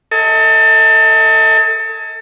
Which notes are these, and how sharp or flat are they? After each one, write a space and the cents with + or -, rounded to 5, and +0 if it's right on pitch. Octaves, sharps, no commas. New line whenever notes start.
A4 +30 D#5 +40 G#5 +25